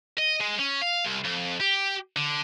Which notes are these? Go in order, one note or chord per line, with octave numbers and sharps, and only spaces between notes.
D#5
G#3
C#4
F5
C2
F2
G4
D3